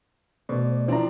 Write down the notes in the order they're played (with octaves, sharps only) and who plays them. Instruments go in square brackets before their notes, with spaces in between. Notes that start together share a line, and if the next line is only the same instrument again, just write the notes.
[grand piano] B2 [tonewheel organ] A3 C5 D5
[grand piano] F3 C4 D4 [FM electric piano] E4 A#5